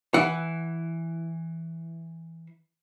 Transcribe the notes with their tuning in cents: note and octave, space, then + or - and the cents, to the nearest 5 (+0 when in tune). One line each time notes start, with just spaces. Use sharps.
E3 +0 F#5 +10